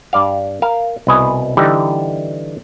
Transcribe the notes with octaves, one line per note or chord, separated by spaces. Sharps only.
G2 D5 F5
A#4 F5
C2 B2 B4 D#5 G#5
D3 E3 G3 D#4 G4